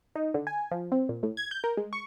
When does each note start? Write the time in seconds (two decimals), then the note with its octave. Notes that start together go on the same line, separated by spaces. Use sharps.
0.16 D#4
0.34 D3
0.47 G#5
0.71 F3
0.92 C4
1.09 A#2
1.23 A2
1.37 G#6
1.51 G6
1.64 A#4
1.77 G#3
1.93 C#6